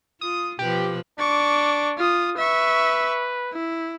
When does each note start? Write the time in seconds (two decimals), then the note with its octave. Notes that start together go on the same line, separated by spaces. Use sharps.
0.21 F4 D#6
0.59 B2 F3 G4 B4
1.19 D4 C#6 D6
1.97 F4 D#6
2.37 B4 E5 C#6
3.52 E4